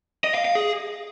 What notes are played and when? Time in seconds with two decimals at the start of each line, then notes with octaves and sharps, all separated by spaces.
0.24 D#5
0.35 F5
0.45 F5
0.55 G#4